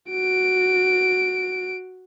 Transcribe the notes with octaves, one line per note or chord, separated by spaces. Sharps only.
F#4 D7